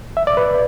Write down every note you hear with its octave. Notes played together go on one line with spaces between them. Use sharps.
E5
D5
B4